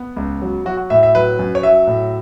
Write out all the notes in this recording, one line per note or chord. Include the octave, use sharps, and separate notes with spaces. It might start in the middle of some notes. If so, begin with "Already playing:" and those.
Already playing: B3
C#2
F#3
F#3 F#4
F#4
A2 E5
E5
F#3 B4
F#2
C#5
F#3 E5
A2